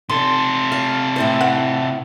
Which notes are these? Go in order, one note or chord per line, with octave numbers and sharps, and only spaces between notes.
C3 A4 C6
F5
A2 E4 C5
F#5